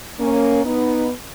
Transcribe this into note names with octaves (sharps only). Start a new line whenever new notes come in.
A#3 C#4
B3 D#4